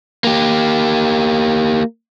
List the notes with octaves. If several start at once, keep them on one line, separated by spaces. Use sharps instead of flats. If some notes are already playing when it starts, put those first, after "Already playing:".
A#3 G4